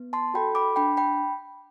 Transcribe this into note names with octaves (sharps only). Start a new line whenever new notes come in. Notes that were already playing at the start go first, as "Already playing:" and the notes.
Already playing: B3
A5 C6
F#4 A4 G5 B5
B5 D6
D4 G5 B5
G5 B5